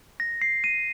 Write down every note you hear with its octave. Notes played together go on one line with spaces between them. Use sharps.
A#6
C7
D#7